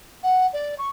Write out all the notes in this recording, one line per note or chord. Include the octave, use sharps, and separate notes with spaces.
F#5
D5
C#6